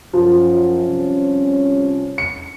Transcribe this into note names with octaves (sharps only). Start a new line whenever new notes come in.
F#2 F3
C2 C#4
C#7